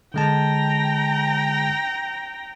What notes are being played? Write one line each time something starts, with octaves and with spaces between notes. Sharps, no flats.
D3 G#3 G5 A5 A#5